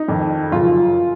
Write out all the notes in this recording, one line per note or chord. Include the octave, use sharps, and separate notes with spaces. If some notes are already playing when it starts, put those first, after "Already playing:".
Already playing: D#4
F2 D#3
F#2 C#3 F4